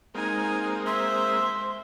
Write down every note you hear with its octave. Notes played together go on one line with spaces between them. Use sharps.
G#3 A#3 C4 D#4 G#5
C5 E5 C6